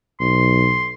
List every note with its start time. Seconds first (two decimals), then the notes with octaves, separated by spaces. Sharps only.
0.20 B1 C6